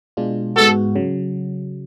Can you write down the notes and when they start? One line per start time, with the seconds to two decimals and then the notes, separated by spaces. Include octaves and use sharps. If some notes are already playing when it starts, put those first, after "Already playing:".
0.17 B2 G#3 D4 F4
0.56 G#2 G#3 B3 F#4 A4
0.95 C#3 F#3